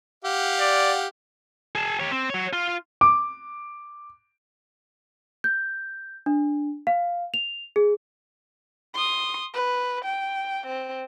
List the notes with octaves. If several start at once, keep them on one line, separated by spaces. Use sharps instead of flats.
G4 F5 F#5
D5
G#4 A5
G4 C#5
C4
F#3 C#5
F4
D6
G6
D4
F5
F7
G#4
C6 D#6
B4
G5
C4